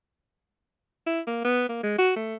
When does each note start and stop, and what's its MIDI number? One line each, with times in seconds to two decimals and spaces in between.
1.07 1.20 64
1.27 1.42 58
1.45 1.67 59
1.69 1.78 58
1.83 1.96 56
1.99 2.14 66
2.16 2.35 57